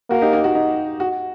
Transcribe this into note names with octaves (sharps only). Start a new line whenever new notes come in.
A#3 F#4
D#4 G4
D#4
F#4
D#4
F#4